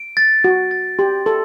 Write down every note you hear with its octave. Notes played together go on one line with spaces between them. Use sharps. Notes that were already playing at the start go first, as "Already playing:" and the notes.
Already playing: D7
A6
F#4 A6
A6
G4 C6
A4 C6